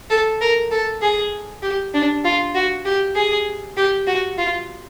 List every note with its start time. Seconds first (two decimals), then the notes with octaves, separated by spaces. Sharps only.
0.10 A4
0.41 A#4
0.71 A4
1.02 G#4
1.63 G4
1.94 D4
2.24 F4
2.55 F#4
2.85 G4
3.15 G#4
3.77 G4
4.07 F#4
4.38 F4